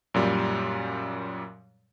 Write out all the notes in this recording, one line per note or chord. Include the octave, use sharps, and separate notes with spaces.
F#2 A#2 G3